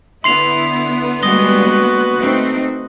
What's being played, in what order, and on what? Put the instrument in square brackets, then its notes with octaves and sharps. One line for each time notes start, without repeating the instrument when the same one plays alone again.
[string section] D3 B3 [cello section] E4 [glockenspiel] C6 C7 F7
[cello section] G3 G#3 A#3 [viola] F#4 B4 [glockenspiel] D#6 A#6 G7
[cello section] A3 C4 D#4